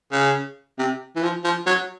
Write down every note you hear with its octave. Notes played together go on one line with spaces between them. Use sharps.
C#3
C3
E3
F3
F3
F#3